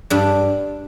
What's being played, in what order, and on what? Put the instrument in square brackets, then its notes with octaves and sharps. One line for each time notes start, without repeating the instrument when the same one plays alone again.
[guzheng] G2 D4